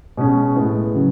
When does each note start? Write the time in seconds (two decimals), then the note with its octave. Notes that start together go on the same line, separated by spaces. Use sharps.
0.17 B2 G#3 C#4
0.56 A2 G#3 B3
0.95 C#3 F#3